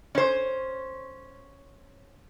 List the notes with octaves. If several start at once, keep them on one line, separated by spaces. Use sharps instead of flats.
C#4 C5